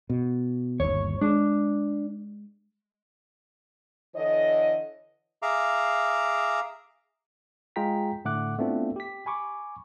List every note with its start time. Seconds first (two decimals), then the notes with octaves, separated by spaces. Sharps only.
0.10 B2
0.80 G1 D#2 C#5
1.21 G#3 D4
4.15 D3 E3 C#5 D#5
5.42 G#4 E5 F5 A#5 D6
7.76 G#3 F4 G#4 G5 A#5 B6
8.25 A2 D3 A3 F#5 D6 F#6
8.58 A3 B3 C4 D4 E4 F4
8.96 G4 B6
9.26 G#5 B5 C#6 D6